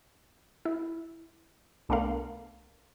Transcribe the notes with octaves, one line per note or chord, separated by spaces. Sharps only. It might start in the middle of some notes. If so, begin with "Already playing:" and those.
E4
C2 A3 B3 D4 A#4 F5